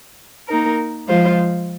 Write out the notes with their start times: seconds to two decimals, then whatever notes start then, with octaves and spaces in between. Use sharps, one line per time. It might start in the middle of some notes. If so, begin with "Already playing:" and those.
0.48 A#3 D#4 A#4
1.08 F3 G#3 F4 C5 F5